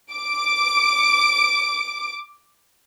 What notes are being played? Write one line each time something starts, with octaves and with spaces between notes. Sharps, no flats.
D6 D7